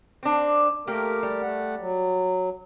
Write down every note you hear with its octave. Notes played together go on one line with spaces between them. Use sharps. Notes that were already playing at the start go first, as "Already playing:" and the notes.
C4 D4
A3 A#3 G4 A#4
G3
A3 F#5
F#3